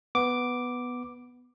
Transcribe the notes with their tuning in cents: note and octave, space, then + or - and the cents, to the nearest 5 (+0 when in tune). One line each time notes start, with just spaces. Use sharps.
B3 +0 D6 +0